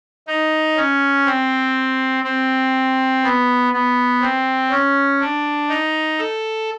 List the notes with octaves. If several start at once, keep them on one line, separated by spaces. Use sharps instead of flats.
D#4
C#4
C4
C4
B3
B3
C4
C#4
D4
D#4
A4